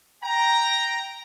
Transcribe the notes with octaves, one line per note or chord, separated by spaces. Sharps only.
G5 A#5